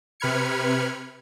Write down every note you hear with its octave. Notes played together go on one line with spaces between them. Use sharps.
C3 B4 B5 F6 G#6 C#7